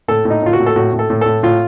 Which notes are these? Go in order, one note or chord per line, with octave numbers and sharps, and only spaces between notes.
A2 A4
A2
D#4
A2 F4
F#4
A2
A4
A2 F#4
A2
A4
A2
A2 A4
A2 F4